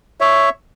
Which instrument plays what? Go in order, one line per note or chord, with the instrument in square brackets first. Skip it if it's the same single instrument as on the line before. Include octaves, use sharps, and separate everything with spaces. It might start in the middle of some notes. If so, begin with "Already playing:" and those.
[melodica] C#5 E5